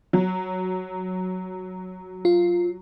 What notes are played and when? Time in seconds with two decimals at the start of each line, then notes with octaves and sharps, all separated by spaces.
0.13 F#3
2.25 F4